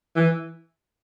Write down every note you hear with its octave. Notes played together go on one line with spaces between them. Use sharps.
E3